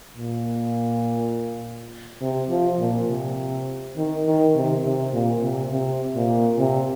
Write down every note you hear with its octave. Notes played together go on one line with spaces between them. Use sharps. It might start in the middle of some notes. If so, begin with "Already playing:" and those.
A#2
C3
F3
A#2
C3
D#3
D#3
C3
C3
A#2
C3
C3
A#2
C3